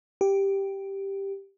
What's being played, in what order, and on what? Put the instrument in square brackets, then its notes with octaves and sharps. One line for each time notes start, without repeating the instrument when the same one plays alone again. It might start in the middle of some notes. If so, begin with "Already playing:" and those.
[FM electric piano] G4